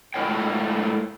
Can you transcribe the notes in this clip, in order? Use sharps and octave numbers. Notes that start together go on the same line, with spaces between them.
G#2 A3 E4 A#4 C#5 G5